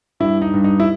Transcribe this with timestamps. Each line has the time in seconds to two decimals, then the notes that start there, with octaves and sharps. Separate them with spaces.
0.20 G2 E4
0.42 D#4
0.54 G2
0.64 D#4
0.80 E4